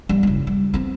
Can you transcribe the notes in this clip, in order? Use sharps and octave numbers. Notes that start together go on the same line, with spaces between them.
G3 B3
F#1 E4
G3
B3 C4